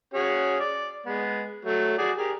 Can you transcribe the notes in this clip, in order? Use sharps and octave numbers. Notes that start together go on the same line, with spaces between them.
C#4 F#4 G#4
D5
G#3 B3
F#3 A3
F#4 G#4 D5
G4 G#4 A#4